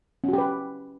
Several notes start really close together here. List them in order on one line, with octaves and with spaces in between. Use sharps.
C#4 F#4 G4 B4